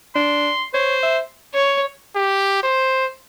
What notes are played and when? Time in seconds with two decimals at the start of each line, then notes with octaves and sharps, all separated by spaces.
0.15 D4 C6
0.74 C5 C#5
1.03 E5
1.54 C#5
2.15 G4
2.63 C5